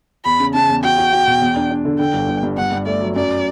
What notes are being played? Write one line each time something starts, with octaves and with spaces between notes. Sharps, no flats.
E2 B5
C#3
C#3 A5
E2
F#4 G5
F#4
F#4
B2
E2
D4
D4
D3
D3 G5
G1
G1
G2
G2 F#5
G2
A3 D5
F#3
F#2 D5